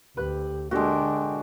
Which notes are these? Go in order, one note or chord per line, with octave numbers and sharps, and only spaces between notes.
D2 G4 B4 F#6
D3 G#3 A#3 D4 F#4 G4 A4 G5